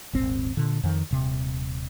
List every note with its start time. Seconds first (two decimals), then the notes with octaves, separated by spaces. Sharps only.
0.13 D#1 G#1 C4
0.57 A#2 D3
0.83 F2 D#3
1.11 D#1 C3